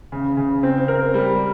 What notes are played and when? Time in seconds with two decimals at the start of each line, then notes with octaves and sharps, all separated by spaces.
0.12 C#3
0.37 C#3
0.63 C4
0.88 A#4
1.14 G3